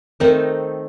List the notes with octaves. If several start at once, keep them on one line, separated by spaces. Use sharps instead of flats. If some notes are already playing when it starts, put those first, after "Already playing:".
D#3 A3 C4 D#4 A#4